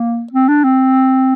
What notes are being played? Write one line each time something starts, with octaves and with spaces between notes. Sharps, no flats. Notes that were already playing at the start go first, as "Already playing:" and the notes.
Already playing: A#3
C4
D4
C4